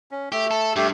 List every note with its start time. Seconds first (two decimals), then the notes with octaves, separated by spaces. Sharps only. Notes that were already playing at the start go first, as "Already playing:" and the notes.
0.11 C#4
0.32 A3 G4
0.51 A4
0.76 G2 A3 G4